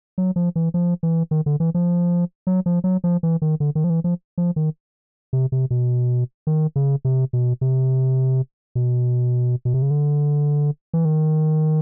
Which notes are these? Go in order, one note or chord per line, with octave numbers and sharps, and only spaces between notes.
F#3
F3
E3
F3
E3
D#3
D3
E3
F3
F#3
F3
F#3
F3
E3
D#3
D3
D#3
F3
E3
F3
F3
D#3
C3
C3
B2
D#3
C#3
C3
B2
C3
B2
B2
C3
C#3
D3
E3
D#3